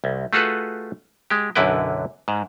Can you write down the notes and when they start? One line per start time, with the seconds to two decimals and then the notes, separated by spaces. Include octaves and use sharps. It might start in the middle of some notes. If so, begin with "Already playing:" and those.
0.04 C2
0.33 A3 F4 F#4 G#4 A4 B4
1.30 G#3 G4
1.55 B1 F#2 D3 E4 B4 G5
2.28 G#2